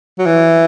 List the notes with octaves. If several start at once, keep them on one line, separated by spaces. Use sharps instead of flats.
F#3
E3